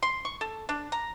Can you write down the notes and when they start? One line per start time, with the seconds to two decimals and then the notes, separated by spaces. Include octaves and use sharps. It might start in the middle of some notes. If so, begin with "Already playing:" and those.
0.03 C6
0.25 C#6
0.41 A4
0.69 D4
0.92 A#5